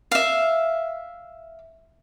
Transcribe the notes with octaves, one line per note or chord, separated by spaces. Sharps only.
E5 F5